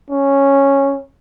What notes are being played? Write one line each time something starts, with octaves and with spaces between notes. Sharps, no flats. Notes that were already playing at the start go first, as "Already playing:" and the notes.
C#4